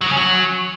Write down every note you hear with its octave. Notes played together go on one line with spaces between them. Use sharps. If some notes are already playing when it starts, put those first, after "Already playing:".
F#3
C#3
C#4
F#3